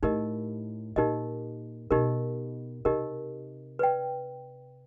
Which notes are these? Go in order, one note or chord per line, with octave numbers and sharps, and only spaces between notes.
A2 D#4 G4 A#4 D#5
A#2 D#4 G4 A#4 D#5
B2 D#4 G4 A#4 D#5
C3 D#4 G4 A#4 D#5
B4 D5 G5